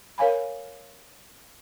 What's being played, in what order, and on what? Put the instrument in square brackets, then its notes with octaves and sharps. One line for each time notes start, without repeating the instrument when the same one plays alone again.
[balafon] A#4 C#5 F5 G#5 B5